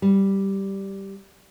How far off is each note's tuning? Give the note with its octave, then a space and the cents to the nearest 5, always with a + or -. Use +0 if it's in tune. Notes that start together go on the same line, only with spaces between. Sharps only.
G3 -5